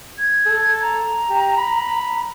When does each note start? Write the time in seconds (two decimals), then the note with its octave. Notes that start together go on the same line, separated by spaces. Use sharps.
0.19 G#6
0.46 A4
0.81 A#5
1.29 G4
1.57 B5